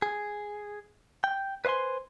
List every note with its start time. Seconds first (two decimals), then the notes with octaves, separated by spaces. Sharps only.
0.02 G#4
1.24 G5
1.65 B4 C5 D#5 G#5 C6